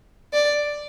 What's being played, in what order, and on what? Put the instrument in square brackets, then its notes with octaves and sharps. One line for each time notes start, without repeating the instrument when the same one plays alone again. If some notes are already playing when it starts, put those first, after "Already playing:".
[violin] D5